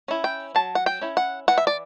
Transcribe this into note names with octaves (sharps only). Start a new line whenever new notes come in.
C#4 E4
G5
F#3 A5
F#5
G5
C#4 E4
F#5
E3 F#5
E5
D5